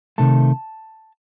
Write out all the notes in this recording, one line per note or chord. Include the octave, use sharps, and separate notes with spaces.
C3 D#3 A3 A5